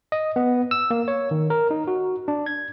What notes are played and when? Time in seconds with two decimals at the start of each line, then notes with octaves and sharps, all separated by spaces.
0.12 D#5
0.36 B3
0.71 E6
0.91 A#3
1.08 C#5
1.31 D#3
1.50 A#4
1.71 D#4
1.88 F#4
2.28 D4
2.46 G#6